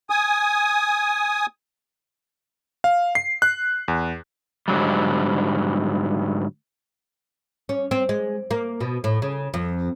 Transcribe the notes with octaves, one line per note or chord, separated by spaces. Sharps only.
G#5 D#6
F5
C7
F#6
E2
G#2 D3 F#3 G3
C#4
C4
G#3
A#3
B2
A2
C#3
F2